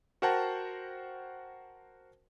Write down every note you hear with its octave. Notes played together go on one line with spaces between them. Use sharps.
F#4 A#4 C5 F#5 G5 A5